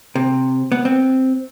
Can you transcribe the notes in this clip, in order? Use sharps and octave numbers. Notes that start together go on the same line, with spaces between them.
C3
B3
C4